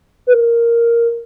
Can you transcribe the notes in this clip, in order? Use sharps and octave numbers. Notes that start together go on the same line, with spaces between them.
B4
A#4